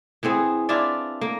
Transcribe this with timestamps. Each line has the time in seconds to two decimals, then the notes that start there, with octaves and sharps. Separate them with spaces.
0.23 E3 B3 C4 G#4
0.69 D4 E4 F4 D5
1.21 A#3